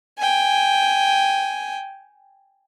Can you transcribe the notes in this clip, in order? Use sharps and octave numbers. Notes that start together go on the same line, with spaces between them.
G5 G#5